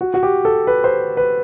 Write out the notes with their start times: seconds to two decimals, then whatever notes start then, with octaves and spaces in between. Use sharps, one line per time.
0.01 F#4
0.14 F#4
0.23 G4
0.45 A4
0.67 B4
0.84 C5
1.17 B4